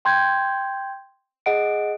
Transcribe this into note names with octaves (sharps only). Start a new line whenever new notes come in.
G5 C6 G6 G#6
G#4 D#5 F#5 D7